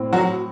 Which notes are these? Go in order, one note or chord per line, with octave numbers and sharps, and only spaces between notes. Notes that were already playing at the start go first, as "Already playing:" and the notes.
Already playing: A2 C4
F#3 F#4